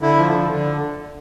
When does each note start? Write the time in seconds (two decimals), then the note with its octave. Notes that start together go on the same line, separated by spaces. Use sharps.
0.01 D3 E4
0.18 F3
0.34 D3
0.50 D3